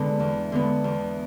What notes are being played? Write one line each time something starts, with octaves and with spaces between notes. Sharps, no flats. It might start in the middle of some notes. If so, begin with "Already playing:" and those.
Already playing: D3 G#3 B3
E2
D3 G#3 B3
E2